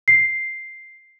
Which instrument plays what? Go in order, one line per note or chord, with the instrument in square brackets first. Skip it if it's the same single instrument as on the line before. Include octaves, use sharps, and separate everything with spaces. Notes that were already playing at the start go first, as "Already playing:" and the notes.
[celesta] C7